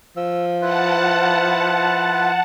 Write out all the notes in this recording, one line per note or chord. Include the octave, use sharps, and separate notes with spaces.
F3 E6
E4 F4 B4 F#5 A5